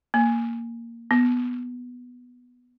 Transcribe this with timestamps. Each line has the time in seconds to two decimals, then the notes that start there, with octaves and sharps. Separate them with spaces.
0.14 A#3
1.11 B3